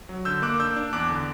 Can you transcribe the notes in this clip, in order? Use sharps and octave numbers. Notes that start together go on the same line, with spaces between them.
F#3
D3 E6 G6
A#3 D6 F#6
D4 E6 G6
D4
E2 D6 F#6
D3